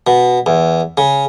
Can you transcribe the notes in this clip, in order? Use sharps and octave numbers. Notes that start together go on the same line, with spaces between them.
B2
E2
C#3